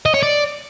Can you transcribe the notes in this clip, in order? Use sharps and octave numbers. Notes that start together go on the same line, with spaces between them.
D#5
C#5
D5